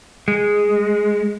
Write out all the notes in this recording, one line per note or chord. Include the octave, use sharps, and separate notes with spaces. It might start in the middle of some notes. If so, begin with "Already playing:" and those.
G#3